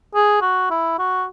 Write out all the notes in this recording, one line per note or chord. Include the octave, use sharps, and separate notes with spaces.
G#4
F#4
E4
F#4